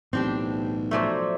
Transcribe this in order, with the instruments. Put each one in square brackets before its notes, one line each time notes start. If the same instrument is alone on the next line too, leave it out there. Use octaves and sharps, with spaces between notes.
[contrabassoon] B1 [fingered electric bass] A2 E3 [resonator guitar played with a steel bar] C4 D4 G4
[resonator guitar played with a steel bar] F3 F#3 A3 [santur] C5 D5 E5